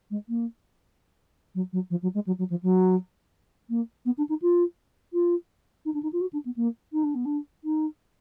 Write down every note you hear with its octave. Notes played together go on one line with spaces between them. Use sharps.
G#3
A#3
F#3
F#3
F3
F#3
G#3
F#3
F#3
F3
F#3
A#3
B3
D4
D#4
F4
F4
D#4
D4
D#4
F4
F#4
D4
B3
A#3
D#4
D4
B3
D4
D#4